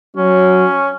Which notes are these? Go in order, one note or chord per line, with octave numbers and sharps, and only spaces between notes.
F#3 C#4